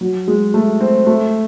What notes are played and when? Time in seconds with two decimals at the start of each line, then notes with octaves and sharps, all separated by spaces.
0.01 F#3
0.28 G#3
0.54 A3
0.81 C4
1.07 A3